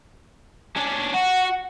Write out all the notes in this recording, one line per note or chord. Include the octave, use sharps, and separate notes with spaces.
C#4 D4
F#4 F#5